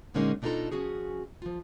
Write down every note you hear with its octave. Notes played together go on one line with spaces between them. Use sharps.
A#2 D3 G#3 A#3 C#4 D#4
B2 D4 D#4 F4 A4 A#5
F3 C#4 F#4 G#4
F3 F4